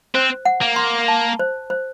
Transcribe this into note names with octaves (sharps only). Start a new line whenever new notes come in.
C4 C5
F#5
A#3
C6
A5
C5
C5